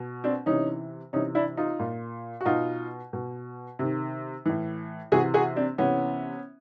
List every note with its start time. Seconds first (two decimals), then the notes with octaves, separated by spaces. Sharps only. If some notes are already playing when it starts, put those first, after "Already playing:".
Already playing: B2
0.24 C4 D4
0.46 C3 E3 C#4 D#4
1.13 C3 E3 C#4 D#4
1.35 D4 E4
1.57 D#4 F4
1.79 A#2
2.41 F#4
2.45 B2 D#4 F4
3.13 B2
3.79 C3 D#3
4.46 A2 E3
5.12 C3 E3 F#4 G#4
5.34 F#4 G#4
5.56 C4 D4
5.78 C3 E3 B3 C#4